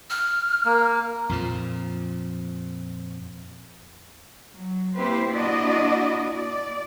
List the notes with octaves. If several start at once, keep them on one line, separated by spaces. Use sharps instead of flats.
F6
A#3
F2 A#2 F3
F#3
A#3 C4 E4 G4 B4 C5
A#3 D4 E4 F#4 D5 D#5
D5